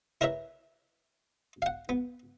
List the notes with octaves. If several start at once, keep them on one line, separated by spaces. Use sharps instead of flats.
E4 A#4 B4 C#5 E5
F5 F#5
B3